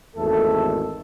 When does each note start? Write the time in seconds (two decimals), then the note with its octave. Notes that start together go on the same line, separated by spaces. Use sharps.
0.16 G#1 E2 A3 A4